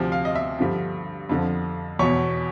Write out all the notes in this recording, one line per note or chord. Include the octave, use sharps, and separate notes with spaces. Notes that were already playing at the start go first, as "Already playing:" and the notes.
Already playing: D2 C3 F3
F5
D#5
E5
G2 D3 F3
F2 D3 F3
E2 B2 C#5